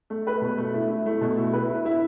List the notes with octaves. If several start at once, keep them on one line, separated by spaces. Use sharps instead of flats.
A3
B4
B2
A3
E4
E4
A3
B2
E4
B4
E4
E4